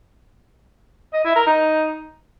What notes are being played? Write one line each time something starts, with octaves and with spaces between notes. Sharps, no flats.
D#5
E4
A#4
D#4